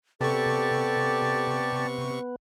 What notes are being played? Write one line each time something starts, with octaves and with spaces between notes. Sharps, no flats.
C3 B3 G4 A4 B4 D5 A5 C#6